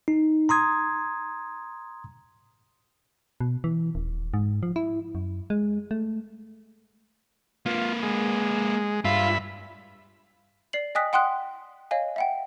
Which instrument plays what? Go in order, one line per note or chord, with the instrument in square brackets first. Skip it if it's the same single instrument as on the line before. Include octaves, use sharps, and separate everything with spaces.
[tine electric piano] D#4
A#5 C6 D#6 G#6
[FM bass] B2
E3
D#1
G#2
F3
E4
F#2
G#3
A3
[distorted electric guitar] A#3 B4 [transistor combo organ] F4
[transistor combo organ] G#3
[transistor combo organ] G2 E5 B5 [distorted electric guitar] F4
[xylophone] D5 C7 F#7
D#5 G5 G#5 D#6 F#6 B6
F#5 G5 C6 D#6 F#6
C#5 D#5 F5 G#5
E5 F#5 G5